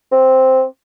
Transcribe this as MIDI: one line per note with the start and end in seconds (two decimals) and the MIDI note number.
0.12 0.63 60